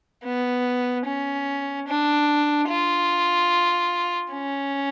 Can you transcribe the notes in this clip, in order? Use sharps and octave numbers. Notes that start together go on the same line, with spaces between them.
B3
C#4
D4
F4
C#4